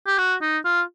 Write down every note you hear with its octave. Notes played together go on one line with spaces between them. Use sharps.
G4
F#4
D#4
F4